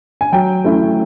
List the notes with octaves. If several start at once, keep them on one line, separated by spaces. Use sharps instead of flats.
G#5
F#3 G5
A3 C#4 E4